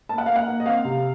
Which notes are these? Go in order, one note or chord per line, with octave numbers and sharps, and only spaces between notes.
A#3 A5
F#5
A#3 F5
F#5
A#3
D#5
C4 F5
C3